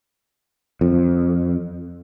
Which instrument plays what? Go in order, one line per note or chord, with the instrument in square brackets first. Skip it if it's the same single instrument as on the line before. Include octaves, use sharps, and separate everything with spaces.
[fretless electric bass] F2